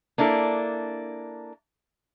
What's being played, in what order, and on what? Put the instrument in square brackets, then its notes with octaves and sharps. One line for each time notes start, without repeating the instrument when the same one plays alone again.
[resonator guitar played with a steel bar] A#3 D4 E4 A4